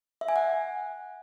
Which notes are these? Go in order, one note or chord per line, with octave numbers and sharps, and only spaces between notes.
E5
G#5
F#5